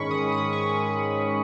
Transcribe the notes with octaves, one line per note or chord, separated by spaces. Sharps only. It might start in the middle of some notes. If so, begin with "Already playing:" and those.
Already playing: G#2 D#3 G#3 C#4 B5 C#6
D#6
D#6
C#6
D#6
C#6